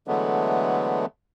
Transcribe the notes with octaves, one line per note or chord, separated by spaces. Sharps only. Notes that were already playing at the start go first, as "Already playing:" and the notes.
D3 E3 F#3 G#3 A3 B3